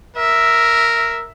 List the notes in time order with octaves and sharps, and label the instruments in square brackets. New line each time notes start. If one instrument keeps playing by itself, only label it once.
[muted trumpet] A#4 [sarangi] E5